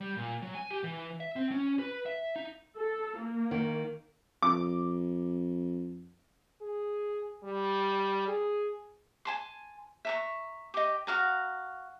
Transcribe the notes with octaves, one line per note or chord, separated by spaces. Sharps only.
G3
A#2
F#3
G#5
G4
E3
E5
C4
C#4
B4
E5
D#4
A4
A#3
D#3
F2 D6
G#4
G3
G#4
G#5 A5 C6
E5 A#5 C#6
G4 D#5
F#4 F5 A#5